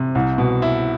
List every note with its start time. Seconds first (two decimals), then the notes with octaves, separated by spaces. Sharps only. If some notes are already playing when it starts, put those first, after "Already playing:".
Already playing: C3
0.15 C2
0.38 B2
0.62 E4